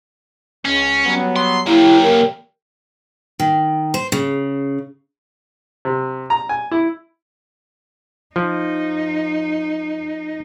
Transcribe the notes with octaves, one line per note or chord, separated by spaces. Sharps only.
C#2 C#4
F#3 G3 B3
C6
F#3 A#3 E4 G4 G5
A#4
D#3
C5
C#3
C3
A#5
G#5
E4
F3 D#4